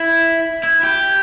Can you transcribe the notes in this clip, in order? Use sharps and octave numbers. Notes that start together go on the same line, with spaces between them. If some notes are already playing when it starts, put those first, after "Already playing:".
Already playing: E4
E4
G4